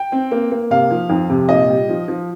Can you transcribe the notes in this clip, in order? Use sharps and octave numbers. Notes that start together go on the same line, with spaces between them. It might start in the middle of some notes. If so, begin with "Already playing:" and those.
Already playing: G5
C4
A#3
A#3
C3 F5
F3
F2
C3
A#2 D#5
G3
F3
F3